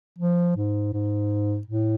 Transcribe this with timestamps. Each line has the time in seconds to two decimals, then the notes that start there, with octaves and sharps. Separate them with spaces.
0.18 F3
0.57 G#2
0.93 G#2
1.67 A2